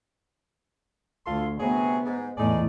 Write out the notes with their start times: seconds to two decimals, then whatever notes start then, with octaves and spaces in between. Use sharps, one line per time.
1.26 D2 F4 A4 C6
1.60 C3 F#3 B3 G#4
2.05 G#2
2.37 E2 A2 D#4 G#4 D5